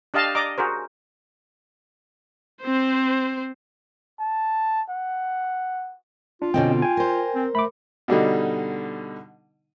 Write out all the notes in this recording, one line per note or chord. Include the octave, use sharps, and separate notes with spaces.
D4 G4 D#5 F5 A5
D5 D#5 A#5 D6
F#4 G#4 A#4 C5
C4 C5
A5
F#5
D4 F4
B2 D3 C4 C#4 D#5 G5
G5 G#5
A#4 C5
C4
A3 B5 D6
B2 D3 G3 D#4